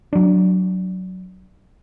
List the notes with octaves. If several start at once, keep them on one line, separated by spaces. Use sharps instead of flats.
F#3 D4